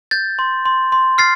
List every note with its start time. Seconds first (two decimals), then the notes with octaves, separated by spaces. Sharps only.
0.11 G6 A6
0.39 C6
0.65 C6
0.92 C6
1.18 F6 A6 C7